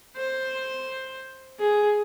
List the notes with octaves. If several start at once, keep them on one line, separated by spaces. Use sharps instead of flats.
C5
G#4